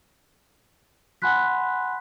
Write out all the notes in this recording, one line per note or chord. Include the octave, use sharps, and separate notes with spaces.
F#5 G#5 B5 C6 F#6 B6